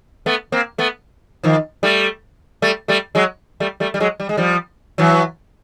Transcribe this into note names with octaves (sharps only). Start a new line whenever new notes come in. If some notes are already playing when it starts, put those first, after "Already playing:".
A3 B3
A#3 C4
A3 B3
D#3 F3
G3 A3
G3 A3
G3 A3
F#3 G#3
G3 A3
G3 A3
G3
F#3 G#3
G3
G#3
F3 G3
E3 F#3